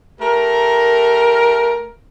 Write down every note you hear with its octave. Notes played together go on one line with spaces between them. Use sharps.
A3 G4 A#4